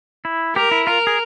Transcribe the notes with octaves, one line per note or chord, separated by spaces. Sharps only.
E4
G4 A#4
E4
F4 A#4
G#4